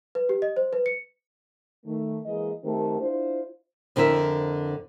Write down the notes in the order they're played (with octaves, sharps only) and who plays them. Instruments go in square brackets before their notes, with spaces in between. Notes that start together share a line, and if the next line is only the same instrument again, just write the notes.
[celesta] B4
G4
D#5
C5
B4
C#7
[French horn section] D#3 A3
E3 G#3 A#3 D#5
D#3 A3 C4 G4 A#4
D4 E4 F4 C5
[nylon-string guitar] F2 D3 E4 A#4 E5